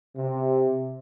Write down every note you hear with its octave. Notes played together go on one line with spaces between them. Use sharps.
C3